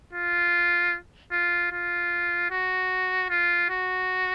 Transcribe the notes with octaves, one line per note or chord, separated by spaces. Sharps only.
F4
F4
F4
F#4
F4
F#4